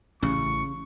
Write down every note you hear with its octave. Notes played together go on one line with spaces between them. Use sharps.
A1 C#3 C#6